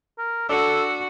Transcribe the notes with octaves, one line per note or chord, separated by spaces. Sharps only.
A#4
D4 F#4 A4 E6